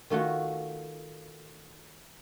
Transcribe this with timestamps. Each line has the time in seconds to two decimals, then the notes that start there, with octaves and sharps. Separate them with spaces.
0.10 D#3 A3 F4 F#4